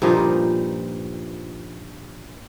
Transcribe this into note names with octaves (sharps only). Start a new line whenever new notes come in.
G2 A#2 F3 D#4